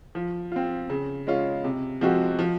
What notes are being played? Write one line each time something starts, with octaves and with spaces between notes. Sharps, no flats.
F3
C4 F4
C#3
G#3 C#4 F4
C3
F3 G#3 C4 F#4
F3